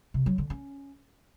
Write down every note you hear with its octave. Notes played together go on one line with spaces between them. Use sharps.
C3
F#3
D3
C#4